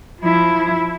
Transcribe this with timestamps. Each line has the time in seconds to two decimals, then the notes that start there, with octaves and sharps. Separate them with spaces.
0.21 F3 E4